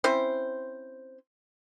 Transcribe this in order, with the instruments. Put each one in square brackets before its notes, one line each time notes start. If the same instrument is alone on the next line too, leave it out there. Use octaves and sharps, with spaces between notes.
[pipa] C4 C#4 E4 C5